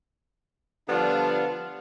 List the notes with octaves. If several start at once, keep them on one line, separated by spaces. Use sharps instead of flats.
D3 F3 G3 B3 D4 F4